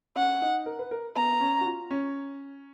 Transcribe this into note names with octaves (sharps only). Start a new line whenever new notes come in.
C#4 F#5
D#4
A#4
B4
A#4
B3 A#5
C#4
F#4
F4
C#4